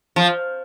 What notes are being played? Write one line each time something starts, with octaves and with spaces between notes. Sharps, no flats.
F3